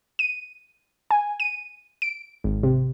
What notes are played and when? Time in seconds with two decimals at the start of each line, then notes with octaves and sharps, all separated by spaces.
0.19 D#7
1.11 G#5
1.40 D#7
2.02 D7
2.44 G#1
2.63 C3